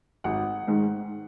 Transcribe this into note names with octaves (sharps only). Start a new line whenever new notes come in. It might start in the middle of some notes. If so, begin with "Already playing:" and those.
G#1 F#5
G#2 D#3 G#3